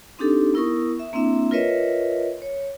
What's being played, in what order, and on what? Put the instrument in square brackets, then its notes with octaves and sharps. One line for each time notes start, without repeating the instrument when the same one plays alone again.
[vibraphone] C4 D4 D#4 G4 A4
B3 E4 A#4 C#6 D#6
E5
A#3 C4 D4 E4 E5
F4 A#4 B4 C#5 D#5 E5
C#5